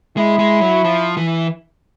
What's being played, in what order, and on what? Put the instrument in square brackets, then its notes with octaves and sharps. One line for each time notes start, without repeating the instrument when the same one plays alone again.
[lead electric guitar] G#3 [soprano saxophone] E4
[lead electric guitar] G#3
F#3
F3
E3